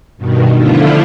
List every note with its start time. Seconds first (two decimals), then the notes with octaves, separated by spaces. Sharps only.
0.17 G2 B2 D#3
0.56 D3 F3 A3 E4 F4